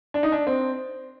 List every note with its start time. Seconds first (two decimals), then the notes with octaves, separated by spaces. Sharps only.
0.14 D4
0.23 D#4
0.32 D4
0.47 C4